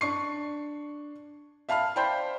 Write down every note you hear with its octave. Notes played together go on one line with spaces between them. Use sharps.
D4 C#6 C7
E5 F5 A5 B5 F6
C5 D5 G5 A5 B5